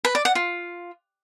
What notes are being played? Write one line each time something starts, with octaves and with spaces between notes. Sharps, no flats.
B4
D5
F#5
F4